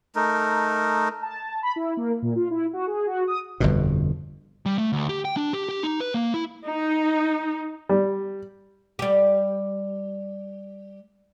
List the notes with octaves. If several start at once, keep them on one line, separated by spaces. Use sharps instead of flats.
A3 D#4 A#4
A5
B5
E4
A#3
A#2
F4
E4
F#4
G#4
F#4
D#6
G1 F2 B2
G3
A3
D2
G4
G5
D4
G4
G4
D#4
B4
A#3
E4
D#4
G3
G3 G4